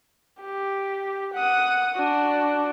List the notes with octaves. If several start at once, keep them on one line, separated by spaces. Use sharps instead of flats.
G4
F#5 D#6
D4 F#4